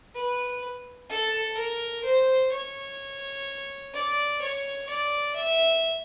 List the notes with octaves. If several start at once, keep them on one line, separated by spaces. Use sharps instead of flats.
B4
A4
A#4
C5
C#5
D5
C#5
D5
E5